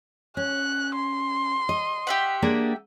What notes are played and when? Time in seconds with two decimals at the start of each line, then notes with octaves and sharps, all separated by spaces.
0.37 C#4 F#6
0.95 C6
1.69 D#5
2.07 G4 E5 F#5
2.42 A#3 D4 G#4